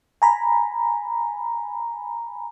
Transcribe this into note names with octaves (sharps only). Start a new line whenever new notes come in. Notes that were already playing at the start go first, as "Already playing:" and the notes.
G#5 A#5 B5